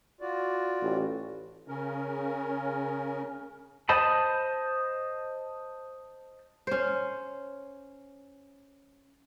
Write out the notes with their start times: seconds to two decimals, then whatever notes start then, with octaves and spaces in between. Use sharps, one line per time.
0.21 F4 F#4 D5
0.82 A1
1.68 C#3 C#4 A#4
3.89 C5 D#5 A5 B5
6.67 C#4 C5